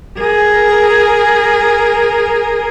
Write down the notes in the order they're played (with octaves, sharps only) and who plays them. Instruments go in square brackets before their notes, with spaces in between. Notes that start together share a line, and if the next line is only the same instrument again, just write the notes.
[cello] G#4 A#4